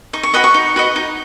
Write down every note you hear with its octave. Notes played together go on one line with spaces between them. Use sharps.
D#4 C#6
C#6
F#4 B4 D#5 D#6
C#6
D#4
F#4 B4 D#5
D#4